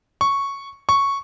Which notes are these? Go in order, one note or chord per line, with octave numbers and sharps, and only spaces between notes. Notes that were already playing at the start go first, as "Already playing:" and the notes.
C#6
C#6